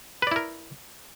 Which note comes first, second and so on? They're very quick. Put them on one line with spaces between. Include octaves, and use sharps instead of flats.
B4 D5 E4 A#4